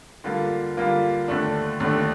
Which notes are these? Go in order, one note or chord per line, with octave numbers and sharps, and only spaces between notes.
D3 G3 A#3 F4
D3 G3 A#3 F4
D#2 D3 A3 D4
D#2 D3 A3 D4